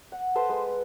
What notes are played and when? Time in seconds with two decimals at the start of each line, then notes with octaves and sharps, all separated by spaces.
0.12 F#5
0.35 A4 B4 C5
0.49 G#3 B4